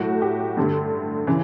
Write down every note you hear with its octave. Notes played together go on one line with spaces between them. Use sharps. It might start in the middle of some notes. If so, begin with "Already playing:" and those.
Already playing: A2 F#3 A3 F#4
G4
G2 D3 A3
C#3 E3